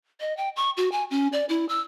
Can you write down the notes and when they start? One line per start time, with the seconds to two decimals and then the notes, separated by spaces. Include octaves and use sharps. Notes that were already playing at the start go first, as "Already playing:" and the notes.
0.20 D#5
0.37 G5
0.56 C#6
0.77 F#4
0.92 G#5
1.11 C#4
1.32 D5
1.49 E4
1.69 E6